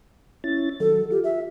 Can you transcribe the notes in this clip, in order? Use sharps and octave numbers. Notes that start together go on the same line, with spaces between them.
C#4 E4 A6
D#3 F#3 A4
F4 G4
E5